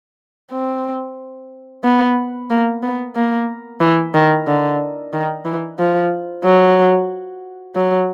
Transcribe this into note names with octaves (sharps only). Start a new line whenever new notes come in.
C4
B3
A#3
B3
A#3
E3
D#3
D3
D#3
E3
F3
F#3
F#3